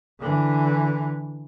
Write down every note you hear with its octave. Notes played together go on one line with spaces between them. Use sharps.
D3 E3